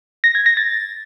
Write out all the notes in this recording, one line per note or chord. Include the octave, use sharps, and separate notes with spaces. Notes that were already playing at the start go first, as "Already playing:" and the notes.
A#6
G#6
A#6
A6